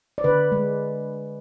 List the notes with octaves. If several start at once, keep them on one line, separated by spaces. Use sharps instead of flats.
D5
D3 B4
G#3